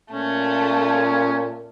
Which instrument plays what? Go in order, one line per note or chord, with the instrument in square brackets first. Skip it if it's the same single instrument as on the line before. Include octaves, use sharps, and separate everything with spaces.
[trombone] A#2 [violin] A3 [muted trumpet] C#4